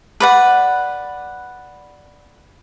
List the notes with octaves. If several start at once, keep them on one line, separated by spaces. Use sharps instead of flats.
B4 D5 F#5